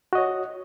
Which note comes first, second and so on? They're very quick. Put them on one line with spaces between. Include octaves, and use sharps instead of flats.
F#4 D#5 C#5